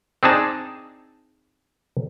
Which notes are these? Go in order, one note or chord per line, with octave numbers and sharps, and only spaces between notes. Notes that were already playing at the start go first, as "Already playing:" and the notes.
C4 D4 D#4 G#4 A5